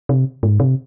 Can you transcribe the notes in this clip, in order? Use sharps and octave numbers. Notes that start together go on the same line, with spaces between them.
C3
G#2
C3